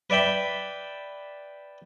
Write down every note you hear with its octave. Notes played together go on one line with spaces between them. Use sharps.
B4 D5 E5 G5 B5